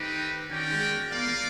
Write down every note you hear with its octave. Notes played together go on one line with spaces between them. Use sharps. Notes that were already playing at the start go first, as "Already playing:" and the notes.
Already playing: D#3 A3 C4 D#4 G4 B4
D#3 C#4 F#4 A#4 D5 G5
G#3
A#3
B3 F4 A#4 D5 F5
A#3